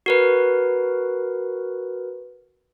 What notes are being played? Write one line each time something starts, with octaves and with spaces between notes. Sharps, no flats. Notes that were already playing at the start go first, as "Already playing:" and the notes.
F#4 A#4 B4